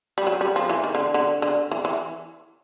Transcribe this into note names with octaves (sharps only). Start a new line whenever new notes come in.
G3
F#3
G3
F3
E3
D#3
D3
D3
D3
E3
E3